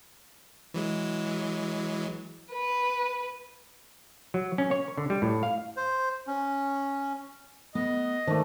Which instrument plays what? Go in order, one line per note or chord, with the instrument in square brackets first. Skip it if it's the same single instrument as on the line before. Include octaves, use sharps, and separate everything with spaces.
[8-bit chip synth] E3 F#3 G#3
[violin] B4
[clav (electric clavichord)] F#3
C#4
C#5
D3
G3
A2
F5
[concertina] C5
C#4
[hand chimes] A3 [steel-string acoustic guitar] B3 [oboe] D#5
[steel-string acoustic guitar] D#3 [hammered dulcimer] A3 D4 [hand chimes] C5